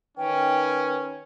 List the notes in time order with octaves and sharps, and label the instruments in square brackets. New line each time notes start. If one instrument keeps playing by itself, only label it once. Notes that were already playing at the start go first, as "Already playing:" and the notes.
[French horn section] D#3 D#4 B4 [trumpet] C#4 [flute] G5